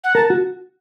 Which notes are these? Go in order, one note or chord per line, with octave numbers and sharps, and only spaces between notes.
F#5
A#4 A5
F#4